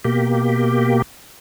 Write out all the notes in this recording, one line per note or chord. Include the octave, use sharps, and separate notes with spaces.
B2 A#3 G4